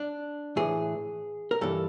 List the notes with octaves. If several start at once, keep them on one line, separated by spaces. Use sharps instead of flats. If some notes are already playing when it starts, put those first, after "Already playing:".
Already playing: D4
A2 E3 G#4
A#4
G2 E3 A4